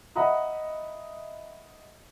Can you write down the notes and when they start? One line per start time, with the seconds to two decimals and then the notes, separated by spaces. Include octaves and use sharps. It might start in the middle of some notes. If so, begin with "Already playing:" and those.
0.16 D#5 E5 F#5 A#5 B5 D#6